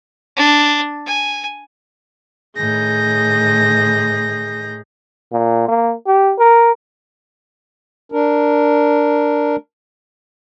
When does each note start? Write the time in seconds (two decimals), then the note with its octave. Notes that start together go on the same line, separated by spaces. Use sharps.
0.37 D4
1.06 G#5
2.57 A2 D#3 G#4 G6 A#6
5.32 A#2
5.68 A#3
6.07 G4
6.39 A#4
8.12 D4 A#4